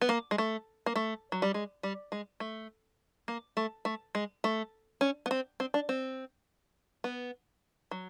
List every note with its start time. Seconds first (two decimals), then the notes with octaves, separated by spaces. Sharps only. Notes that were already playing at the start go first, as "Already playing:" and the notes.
0.01 B3
0.09 A#3
0.31 G#3
0.38 A3
0.86 A#3
0.96 A3
1.32 F#3
1.42 G3
1.54 G#3
1.83 G3
2.12 G#3
2.40 A3
3.28 A#3
3.57 A3
3.85 A3
4.15 G#3
4.44 A3
5.01 C#4
5.26 B3
5.31 C4
5.60 C4
5.74 D4
5.89 C4
7.04 B3
7.91 F#3